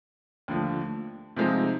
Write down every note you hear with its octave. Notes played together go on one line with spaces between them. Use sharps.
D#2 D3 F3 A3
C3 F3 G#3 C4 D#4